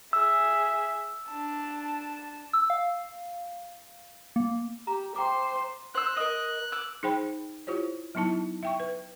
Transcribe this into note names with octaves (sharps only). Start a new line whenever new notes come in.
G#4 E5 E6
D4 A5
E6
F5
A#3
G4 A#5
C5 G5 A#5 C6 D6
C5 E6 F#6
A#4 D#5
D6 E6
D#4 G#4 C5 G5 B5
E4 F4 G4 C5 C#5
F#3 B3 D#4 E4 A5
E5 G5 C#6
B4